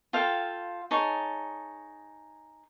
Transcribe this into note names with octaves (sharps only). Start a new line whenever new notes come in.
F4 A4 F5 G5
D#4 G#4 C#5 A5